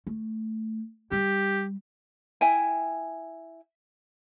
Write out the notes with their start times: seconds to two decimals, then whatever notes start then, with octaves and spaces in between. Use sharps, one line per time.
0.07 A3
1.12 G3 G4
2.41 E4 E5 G5 G#5